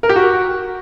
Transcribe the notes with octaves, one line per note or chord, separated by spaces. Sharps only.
A#4
G4
F#4